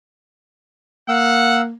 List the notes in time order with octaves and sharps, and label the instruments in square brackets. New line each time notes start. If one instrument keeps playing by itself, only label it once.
[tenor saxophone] A#3 [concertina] F5 E6 [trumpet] F#5